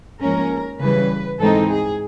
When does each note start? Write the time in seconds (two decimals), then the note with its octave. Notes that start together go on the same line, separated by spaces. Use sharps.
0.21 G#2 F3 A#3 C#4 A#4
0.80 C#3 E3 G3 B4
1.38 G#2 E3 G#3 C4 D#4 A4
1.68 G#4